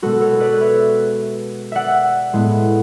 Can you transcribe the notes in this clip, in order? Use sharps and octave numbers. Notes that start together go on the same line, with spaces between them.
B2 G#3 B3 F#4 A4
A4 C#5
B4 D5
C#5 E5
D5 E5 F#5
A2 G#3 B3